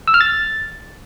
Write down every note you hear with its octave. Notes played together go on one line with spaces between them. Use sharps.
E6
F6
A6